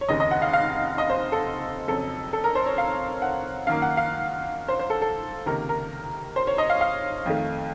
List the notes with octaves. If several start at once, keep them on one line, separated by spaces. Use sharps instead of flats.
C#5
F1 D#2 C#3 D#5
D#5
F#5
F5
F5
D#5
C5
A4
F2 C#3 F#3 A4
A4
A#4
C5
C#5
F5
F#5
F#2 D#3 A#3 F5
F#5
F5
C5
C5
A4
A4
C#2 C3 D#3 A#3 A#4
A#4
C5
C#5
D#5
F5
F5
F2 D#3 A3